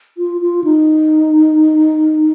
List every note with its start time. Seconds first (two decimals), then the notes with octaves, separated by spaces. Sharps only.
0.18 F4
0.41 F4
0.64 D#4